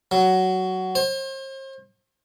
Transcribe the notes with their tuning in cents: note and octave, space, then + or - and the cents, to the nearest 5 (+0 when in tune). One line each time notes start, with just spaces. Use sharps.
F#3 +10
C5 +40